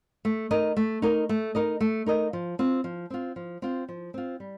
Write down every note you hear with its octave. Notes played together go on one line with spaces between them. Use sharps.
A3
D#4 A#4 D#5
A3
D#4 A#4 D#5
A3
D#4 A#4 D#5
A3
D#4 A#4 D#5
F3
C4 F4
F3
C4 F4
F3
C4 F4
F3
C4 F4
G3